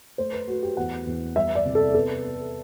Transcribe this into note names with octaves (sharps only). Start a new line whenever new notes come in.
A3 C5
B4
A3 F#4
G4
E2 F#5
E2
G3 E5
D5
C3
A4
B3 A4
B3